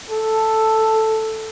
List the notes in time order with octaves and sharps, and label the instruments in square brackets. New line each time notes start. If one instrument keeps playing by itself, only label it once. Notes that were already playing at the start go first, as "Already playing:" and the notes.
[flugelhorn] A4